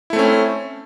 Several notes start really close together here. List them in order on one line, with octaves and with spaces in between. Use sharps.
E4 A3 C4 C#4